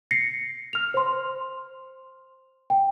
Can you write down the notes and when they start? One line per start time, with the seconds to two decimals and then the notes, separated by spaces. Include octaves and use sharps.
0.11 A#6 C7 C#7
0.73 F6 F7
0.94 C5 C6
2.70 G5